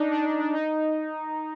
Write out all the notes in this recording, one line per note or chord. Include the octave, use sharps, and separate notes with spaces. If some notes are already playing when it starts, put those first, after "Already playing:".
Already playing: D4 D#4
D4
D4
D4
D#4